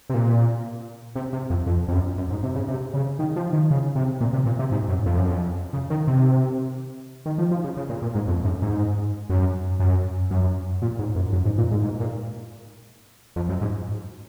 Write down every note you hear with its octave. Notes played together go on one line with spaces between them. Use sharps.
C3
A#2
C3
C3
F2
F2
F2
F#2
F#2
G#2
C3
C#3
C3
C#3
D#3
F3
D#3
C#3
C3
A#2
C3
A#2
C3
G#2
F#2
F2
F#2
F2
C#3
D#3
C3
D#3
F3
F3
C#3
C#3
A#2
A#2
G#2
F2
F#2
G#2
F#2
F#2
F#2
A#2
G#2
F#2
F#2
G#2
A#2
G#2
G#2
A#2
F2
F#2
G#2